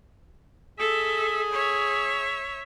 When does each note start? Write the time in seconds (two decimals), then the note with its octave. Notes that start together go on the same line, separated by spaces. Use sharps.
0.79 G#4 A4 E5
1.52 C#5 E5